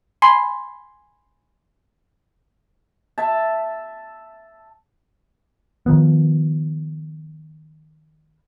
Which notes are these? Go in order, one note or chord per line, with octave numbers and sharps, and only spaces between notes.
G#5 B5 C6 C7
E5 A5
D#3 F3 B3